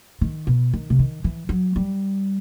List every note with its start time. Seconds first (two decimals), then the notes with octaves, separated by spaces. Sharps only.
0.21 D#3
0.47 B2
0.73 D#3
0.90 C3
0.99 D#3
1.24 E3
1.49 F#3
1.76 G3